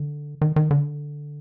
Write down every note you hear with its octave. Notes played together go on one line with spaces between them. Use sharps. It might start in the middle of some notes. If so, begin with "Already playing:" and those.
Already playing: D3
D#3
D#3
D3